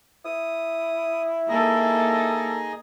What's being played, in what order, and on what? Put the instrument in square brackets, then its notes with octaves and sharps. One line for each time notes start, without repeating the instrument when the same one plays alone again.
[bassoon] E4 [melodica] D#6
[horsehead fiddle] A#3 A4 [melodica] D#4 G#4 D#5